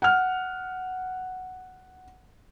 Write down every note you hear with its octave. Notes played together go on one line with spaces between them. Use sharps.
F#5 F6